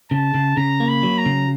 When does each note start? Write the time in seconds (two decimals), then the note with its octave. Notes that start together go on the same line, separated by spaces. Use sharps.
0.11 C#3 A5
0.34 C#3
0.57 C#3 A#5
0.80 A#3
0.88 B5
1.03 F#3
1.18 A#5
1.26 C#3